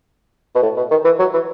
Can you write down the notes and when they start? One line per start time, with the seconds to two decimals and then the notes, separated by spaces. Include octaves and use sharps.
0.55 B2
0.62 A2
0.77 B2
0.91 D#3
1.05 E3
1.19 F#3
1.33 E3